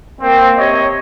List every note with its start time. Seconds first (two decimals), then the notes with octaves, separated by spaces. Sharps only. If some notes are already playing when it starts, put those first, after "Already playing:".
0.22 A#3 C4
0.58 C3 C#5 D#5